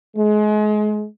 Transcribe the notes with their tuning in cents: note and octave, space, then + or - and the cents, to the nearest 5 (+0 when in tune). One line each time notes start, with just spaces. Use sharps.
G#3 +30